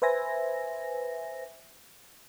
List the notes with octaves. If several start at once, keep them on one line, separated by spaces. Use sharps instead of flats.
B4 C5 E5 G#5 A#6